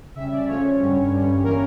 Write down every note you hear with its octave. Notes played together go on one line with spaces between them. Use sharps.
C#3 G3 C#4 E5
D5
C#3 F3 A3 C#4 C#5
G2 D3 G3 C#4
G2 D3 G3 C#4
E3 A#3 C#4 A#4